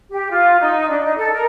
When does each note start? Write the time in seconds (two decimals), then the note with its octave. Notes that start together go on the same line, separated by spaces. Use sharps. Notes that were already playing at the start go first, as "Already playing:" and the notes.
0.11 G4
0.30 F4
0.60 D#4
0.88 D4
1.03 D#4
1.17 A4
1.32 A#4